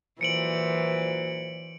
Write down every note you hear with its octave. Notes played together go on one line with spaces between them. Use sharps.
A#2 E3 F#3 C5 C#7 D7 F#7